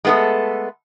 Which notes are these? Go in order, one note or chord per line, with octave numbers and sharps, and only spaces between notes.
G#3 A3 B3 G4 A4